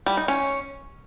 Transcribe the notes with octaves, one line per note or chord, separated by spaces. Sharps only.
G3
D#4
C#4